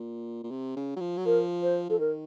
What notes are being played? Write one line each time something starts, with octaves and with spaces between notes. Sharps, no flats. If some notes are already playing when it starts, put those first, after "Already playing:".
Already playing: A#2
A#2
C3
C#3
F#3
F3
F#3
F3 A#4
C5
F3 A4
D#3 A#4